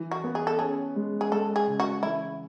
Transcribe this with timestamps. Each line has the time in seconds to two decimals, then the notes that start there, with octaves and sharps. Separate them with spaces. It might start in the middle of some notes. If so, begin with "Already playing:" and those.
Already playing: E3
0.11 F#4
0.24 B3
0.35 G#4
0.47 A4
0.59 C#4 G#4
0.96 G#3
1.21 G#4
1.31 G#3 A4
1.56 G#4
1.68 C#3
1.80 F#4
2.03 E3 E4